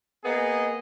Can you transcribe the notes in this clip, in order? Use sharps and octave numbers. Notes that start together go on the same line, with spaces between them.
A#3 B3 G#4 D#5